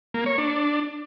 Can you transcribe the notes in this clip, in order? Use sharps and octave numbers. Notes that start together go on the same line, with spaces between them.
A#3
C#5
D4